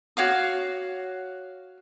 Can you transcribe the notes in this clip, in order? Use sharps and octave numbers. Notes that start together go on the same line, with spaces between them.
F#4 C#5 F5 D6